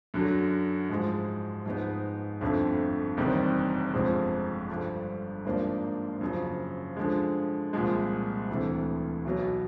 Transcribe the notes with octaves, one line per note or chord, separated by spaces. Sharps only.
F#2 D3 F#3
G#2 F3 G#3
G#2 F3 G#3 B3 D#4
G1 F2 D3 F3 A3
F#1 E2 C3 D#3 G3
G1 F2 C3 F3 G#3
G2 D3 F3
G#1 G#2 F3 A#3 D4
F#2 C#3 F3
D3 F3 G#3
C2 A#2 F3 G#3
D2 C3 E3 A3
B1 B2 F#3 B3